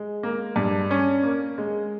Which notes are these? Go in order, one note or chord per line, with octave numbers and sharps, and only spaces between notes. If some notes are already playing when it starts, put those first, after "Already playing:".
Already playing: G#3
A#3
G2
C#4
A#3
G#3